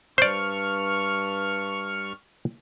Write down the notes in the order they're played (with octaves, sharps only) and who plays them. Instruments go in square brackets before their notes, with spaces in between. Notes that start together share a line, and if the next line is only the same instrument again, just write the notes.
[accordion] G2 C#6 F6 [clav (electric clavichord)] C5 D5